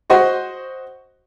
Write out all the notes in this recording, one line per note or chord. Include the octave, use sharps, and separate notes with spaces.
F#4 C5 D#5 C#6